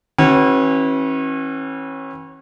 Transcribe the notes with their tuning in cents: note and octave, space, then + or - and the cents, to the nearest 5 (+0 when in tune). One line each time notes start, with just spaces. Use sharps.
E3 -25 C#4 -35 F#4 +25